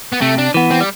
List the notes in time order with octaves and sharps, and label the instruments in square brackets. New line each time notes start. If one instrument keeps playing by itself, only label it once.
[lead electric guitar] B3
[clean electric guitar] C3 [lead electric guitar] A3
[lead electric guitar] D4
[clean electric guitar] E3 B3
[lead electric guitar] C4
G3